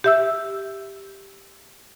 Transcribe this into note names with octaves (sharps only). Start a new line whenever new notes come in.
G4 E5 E6